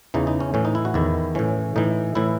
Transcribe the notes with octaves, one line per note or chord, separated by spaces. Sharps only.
E2 C#3 E3 D#4
D#4
C#4
A2 E3 C#4
D#4
E4
F#4
E2 D#3 E4
A2 E3 C#4
A2 E3 D#4
A2 E3 E4